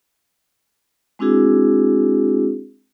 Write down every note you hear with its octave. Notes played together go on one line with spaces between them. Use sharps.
G#3 C4 D4 E4 F#4 G#4